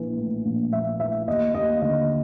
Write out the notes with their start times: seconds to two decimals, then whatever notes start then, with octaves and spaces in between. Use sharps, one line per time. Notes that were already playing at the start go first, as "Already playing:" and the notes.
Already playing: A#1 E3
0.17 A2
0.45 A#1
0.73 A#1 E5
1.00 E3 E5
1.28 D#2 D#5
1.54 D#2 D#5
1.82 D3 D#5